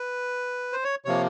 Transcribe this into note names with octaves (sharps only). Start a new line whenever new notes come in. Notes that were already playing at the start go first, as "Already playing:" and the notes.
Already playing: B4
C5
C#5
C3 F3 A#3 C#5